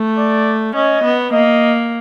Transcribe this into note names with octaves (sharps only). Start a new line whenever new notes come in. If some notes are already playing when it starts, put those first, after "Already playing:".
Already playing: A3
D5
C#4 D#5
B3
A#3 D#5